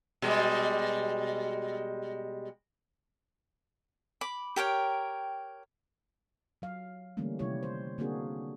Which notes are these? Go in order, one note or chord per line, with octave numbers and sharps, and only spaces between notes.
B2 G3 G#3
B5 D6
G4 A#4 C#5 G5
F#3 F5
D3 E3 G3 A3 A#3 C#4
C3 D#3 G3 E4 G4 C#5
C5
D3 A#3 C4 D4 F#4 G#4